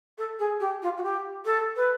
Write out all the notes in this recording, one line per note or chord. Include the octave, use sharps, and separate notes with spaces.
A4
G#4
G4
F4
F#4
G4
A4
B4